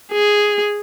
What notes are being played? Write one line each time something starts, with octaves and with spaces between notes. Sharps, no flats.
G#4